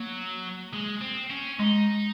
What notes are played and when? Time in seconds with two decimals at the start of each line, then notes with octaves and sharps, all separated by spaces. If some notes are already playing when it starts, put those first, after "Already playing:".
Already playing: F#3 A#3
0.73 G#3
1.01 C4
1.30 C#4
1.59 G#3 D#4